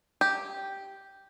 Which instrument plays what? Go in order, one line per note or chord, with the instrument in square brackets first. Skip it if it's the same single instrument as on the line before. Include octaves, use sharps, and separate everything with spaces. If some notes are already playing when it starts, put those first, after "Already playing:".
[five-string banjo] G4